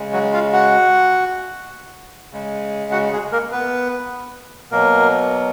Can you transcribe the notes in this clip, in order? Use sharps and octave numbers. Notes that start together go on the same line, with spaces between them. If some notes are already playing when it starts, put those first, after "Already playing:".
Already playing: C#3 G#3
F#3 F#4
F4 F5
F#4 F#5
C#3 G#3
F#4 F#5
G#3 G#4
A#3 A#4
B3 B4
B2 F#3 A#3 A#4